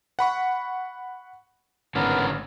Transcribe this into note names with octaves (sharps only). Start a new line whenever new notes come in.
F#5 B5 C#6
G#1 A2 D3 B3 C#4 A#4